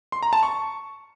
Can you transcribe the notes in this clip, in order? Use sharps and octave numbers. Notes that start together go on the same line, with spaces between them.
C6
A#5
A5
C#6